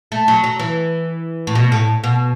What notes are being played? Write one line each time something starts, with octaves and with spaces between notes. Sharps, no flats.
A3
F#3
F#3
E3
A2
B2
A2
B2